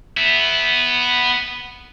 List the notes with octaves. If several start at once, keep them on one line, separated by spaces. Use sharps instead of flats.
B3 E5